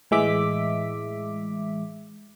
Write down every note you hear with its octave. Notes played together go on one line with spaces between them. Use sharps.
A2 E3 G#3 E5 D6 B6